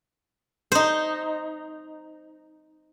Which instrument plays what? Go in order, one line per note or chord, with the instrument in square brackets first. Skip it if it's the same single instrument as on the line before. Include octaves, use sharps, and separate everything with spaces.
[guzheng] D#4 C5